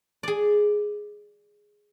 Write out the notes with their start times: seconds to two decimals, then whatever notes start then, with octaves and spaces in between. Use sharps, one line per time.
0.23 G#4 D5